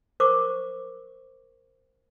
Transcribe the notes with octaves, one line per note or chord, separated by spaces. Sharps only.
A#4 C5 C#6 D6